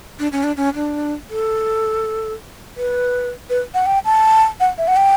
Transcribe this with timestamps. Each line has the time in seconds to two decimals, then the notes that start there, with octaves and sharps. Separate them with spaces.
0.19 D4
0.32 C#4
0.43 D4
0.57 C#4
0.75 D4
1.30 A4
2.77 B4
3.50 B4
3.74 F#5
3.86 G5
4.05 A5
4.60 F#5
4.78 E5
4.88 F#5
4.96 G5